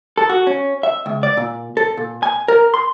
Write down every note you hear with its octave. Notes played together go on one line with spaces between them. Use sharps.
A4
F#4
C#4
E5
C#2
D5
A#2
A4
A#2
G#5
A#4
C6